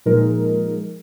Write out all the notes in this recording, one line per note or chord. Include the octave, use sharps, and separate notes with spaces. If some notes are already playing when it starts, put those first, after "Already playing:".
A#2 F3 G#3 D#4 A#4